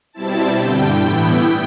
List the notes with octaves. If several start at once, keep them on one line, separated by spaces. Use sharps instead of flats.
B2 G3 C4 E4 A5
G2 D3 G3 G5
A2 E3 B3 E4